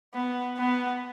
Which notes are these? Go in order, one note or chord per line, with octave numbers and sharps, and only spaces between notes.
B3
B3